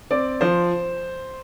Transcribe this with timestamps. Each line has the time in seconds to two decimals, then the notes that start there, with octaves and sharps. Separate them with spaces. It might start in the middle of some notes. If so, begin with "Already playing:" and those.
0.11 C4 D5
0.41 F3 C5